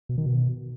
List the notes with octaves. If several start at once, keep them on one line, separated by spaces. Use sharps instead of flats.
B2
D#3
B2